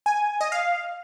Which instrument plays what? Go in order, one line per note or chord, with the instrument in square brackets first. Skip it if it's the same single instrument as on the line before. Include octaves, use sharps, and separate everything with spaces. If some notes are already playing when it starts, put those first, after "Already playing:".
[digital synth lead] G#5
D#5
F5